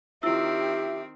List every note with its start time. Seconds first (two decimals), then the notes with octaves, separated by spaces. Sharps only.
0.23 D#3 C4 E4 F4 G4 E5 E6